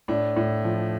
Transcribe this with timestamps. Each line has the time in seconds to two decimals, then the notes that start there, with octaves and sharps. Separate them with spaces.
0.08 A2 D4
0.36 A2
0.64 F3